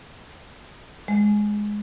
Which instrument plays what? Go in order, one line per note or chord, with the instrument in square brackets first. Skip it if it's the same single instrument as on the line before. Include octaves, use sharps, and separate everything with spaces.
[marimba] G#3